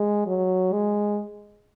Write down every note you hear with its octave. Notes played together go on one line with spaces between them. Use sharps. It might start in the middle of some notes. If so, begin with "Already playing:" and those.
Already playing: G#3
F#3
G#3